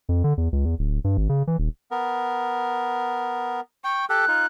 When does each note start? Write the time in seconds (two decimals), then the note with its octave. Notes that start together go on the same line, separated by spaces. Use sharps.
0.09 F2
0.24 D3
0.37 E2
0.52 C#2
0.65 E2
0.79 D1
1.04 G2
1.17 G#1
1.29 C#3
1.47 E3
1.58 D#1
1.91 B3 A#4
3.84 G5 C#6
4.09 G4 A4 F#6
4.28 D#4 F4